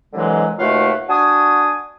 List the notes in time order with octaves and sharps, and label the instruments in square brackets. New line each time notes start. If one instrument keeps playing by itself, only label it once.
[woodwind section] C2 D3 E3 F#3 G#3
D#2 B2 A3 F4 F#5
D4 F#4 G#5 D#6